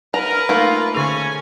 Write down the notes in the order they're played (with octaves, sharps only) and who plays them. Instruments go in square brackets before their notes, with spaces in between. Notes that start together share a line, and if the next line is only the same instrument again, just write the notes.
[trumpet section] A#4 [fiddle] B4 [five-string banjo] A#5
[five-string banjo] A3 A#3 A#4 [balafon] D#4 [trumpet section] F4
[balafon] D3 G#4 [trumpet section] C#4 [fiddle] G#5